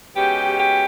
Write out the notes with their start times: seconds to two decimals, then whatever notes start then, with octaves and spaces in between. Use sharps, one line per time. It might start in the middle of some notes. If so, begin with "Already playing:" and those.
0.15 B2 G#3 C#4 G4
0.58 G4